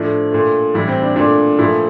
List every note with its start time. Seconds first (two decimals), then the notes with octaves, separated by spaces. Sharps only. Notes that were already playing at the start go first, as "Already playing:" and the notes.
Already playing: A2 F3 A3 D4
0.32 A#2 A3
0.74 A2 E3 G3 E4
0.88 C4
1.02 D4
1.16 A#2 A3 D4
1.59 A#2 F3 A3 E4